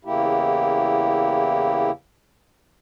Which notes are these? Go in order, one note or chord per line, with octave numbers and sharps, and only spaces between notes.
E2 C#3 A#3 E4 G4